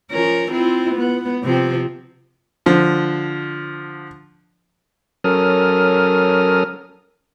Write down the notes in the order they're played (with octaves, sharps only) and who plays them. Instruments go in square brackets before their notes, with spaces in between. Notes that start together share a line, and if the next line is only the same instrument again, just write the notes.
[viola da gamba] F3 C#4 A#4
C4 E4 F4
B3
C3 F3 C4
[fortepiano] D3 F3
[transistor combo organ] F#3 C#4 A4 A#4 D#6 F6